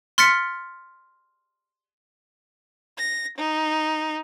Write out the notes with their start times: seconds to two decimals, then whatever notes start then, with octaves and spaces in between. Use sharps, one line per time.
0.18 C6 F6 A6 B6 C#7
2.97 A#6
3.37 D#4